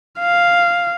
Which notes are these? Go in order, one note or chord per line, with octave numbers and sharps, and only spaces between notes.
F5